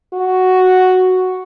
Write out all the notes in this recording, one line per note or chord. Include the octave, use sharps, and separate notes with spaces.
F#4